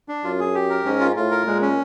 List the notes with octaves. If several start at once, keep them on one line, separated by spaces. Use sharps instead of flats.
D4
F#2 F4
G#4
G4
A#4
G#2 C#4
F4
A2 F4
A#4
A#2 G#3
C#4